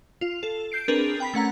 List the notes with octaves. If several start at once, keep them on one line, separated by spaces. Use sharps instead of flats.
F4
A4
G6 C7 D7
C4 D4 G#4 A#4 B4
G5 B5 B6
A3 C#4 F#5 A#5